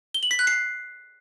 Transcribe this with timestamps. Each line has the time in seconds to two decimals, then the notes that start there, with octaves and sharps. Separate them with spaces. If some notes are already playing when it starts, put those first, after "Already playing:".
0.14 G7
0.23 F#7
0.31 B6
0.39 F#6
0.47 C7